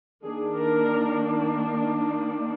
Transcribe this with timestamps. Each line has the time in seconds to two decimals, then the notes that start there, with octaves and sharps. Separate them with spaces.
0.24 D#3 A#3 D4 G#4
0.59 A#4